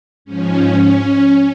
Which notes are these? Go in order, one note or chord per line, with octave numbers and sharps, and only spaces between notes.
G#2 F3 C#4
C#4